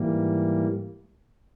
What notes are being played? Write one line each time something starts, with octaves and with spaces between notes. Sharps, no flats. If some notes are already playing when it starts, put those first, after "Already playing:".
Already playing: G#2 E3 G3 A#3